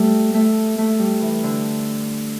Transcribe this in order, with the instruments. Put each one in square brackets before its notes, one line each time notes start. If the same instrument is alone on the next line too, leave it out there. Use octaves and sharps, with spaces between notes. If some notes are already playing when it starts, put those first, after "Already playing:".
Already playing: [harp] G3 A3
A3
A3
G3
E3
D3